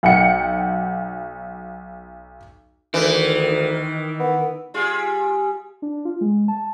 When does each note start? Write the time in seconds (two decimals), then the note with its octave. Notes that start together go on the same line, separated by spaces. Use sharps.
0.03 B1 F#5 G5 C#7
2.94 D2 D#3 E3
4.20 B3
4.74 G3 F4 G#4
5.82 D4
6.05 F4
6.21 G#3
6.48 A5